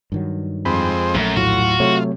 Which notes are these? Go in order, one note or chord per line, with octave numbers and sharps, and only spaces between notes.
G2 D#3 F#3
F2 G#3 C4 B5
A#1 F#2 D#3 A3
D#2 A2 F#3 F4 F#4
C3 F#3 A3 C#5